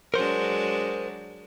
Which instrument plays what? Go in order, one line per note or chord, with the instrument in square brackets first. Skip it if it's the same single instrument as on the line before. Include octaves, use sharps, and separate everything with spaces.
[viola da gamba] F#3 G#3 D4 [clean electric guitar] A#4 C5